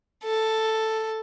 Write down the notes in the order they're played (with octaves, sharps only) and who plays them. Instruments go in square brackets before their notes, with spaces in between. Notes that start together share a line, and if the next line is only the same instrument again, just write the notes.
[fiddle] A4